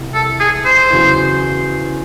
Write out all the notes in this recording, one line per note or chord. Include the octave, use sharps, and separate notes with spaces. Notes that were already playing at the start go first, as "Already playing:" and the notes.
Already playing: C2 C3 E3
A4
G#4
C5
E2 C#3 F#3